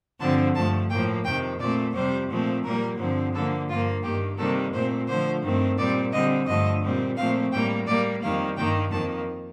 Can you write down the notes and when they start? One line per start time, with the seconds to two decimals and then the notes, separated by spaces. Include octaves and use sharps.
0.20 G2 D3 F3 C4 A5
0.54 G2 F3 A3 A5
0.89 A2 F3 A#3 G5
1.24 F2 C3 D#3 G5
1.59 A#2 A3 C4 D5
1.94 F2 C3 G3 C4 C5
2.29 A#2 F3 A3 C4
2.64 A#2 G3 A#3 A#4
2.98 G2 D3 F3 C4
3.33 D3 F3 A#3 A4
3.68 G2 F3 A#3 F4
4.03 G2 D#3 A#3 G4
4.37 C3 D#3 G3 A#3 A4
4.73 A#2 A3 C4 C5
5.07 D3 F3 A3 C5
5.43 G2 D#3 A3 C4
5.77 A#2 G3 C4 D5
6.12 D3 G3 C4 D#5
6.47 G2 D3 F3 A3 D#5
6.82 A#2 G3 C4
7.16 A#2 F3 A3 C4 F5
7.51 A2 G3 A#3 G5
7.86 A2 G3 A#3 D5
8.21 F2 D#3 G3 A#3 F5
8.56 G2 D#3 A#3 G5
8.91 F2 D#3 A#3 A5